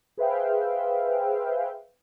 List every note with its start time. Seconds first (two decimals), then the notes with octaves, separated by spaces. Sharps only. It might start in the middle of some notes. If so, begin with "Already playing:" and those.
0.17 G#4 B4 C5 E5 F5 G5